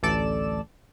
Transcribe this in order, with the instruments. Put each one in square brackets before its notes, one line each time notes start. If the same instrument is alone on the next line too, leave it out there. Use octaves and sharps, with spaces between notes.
[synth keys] A1 D2 A4 D5 E7